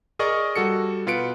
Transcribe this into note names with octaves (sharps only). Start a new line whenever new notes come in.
G#4 A#4 D5 D#5 C#6
G3 F#4 A4 C#7
B2 F4 B4 C#7 D7